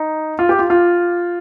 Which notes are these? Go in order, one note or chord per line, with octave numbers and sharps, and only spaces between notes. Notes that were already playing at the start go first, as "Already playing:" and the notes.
Already playing: D#4
F4
G4
F4
F4